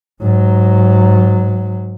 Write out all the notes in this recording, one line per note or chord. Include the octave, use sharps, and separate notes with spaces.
G#2 F#3